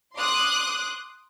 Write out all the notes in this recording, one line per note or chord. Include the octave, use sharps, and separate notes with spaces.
C6 D6 D#6 F#6